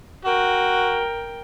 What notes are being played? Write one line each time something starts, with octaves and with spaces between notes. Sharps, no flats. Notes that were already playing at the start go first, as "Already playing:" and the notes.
F#4 A#4 G5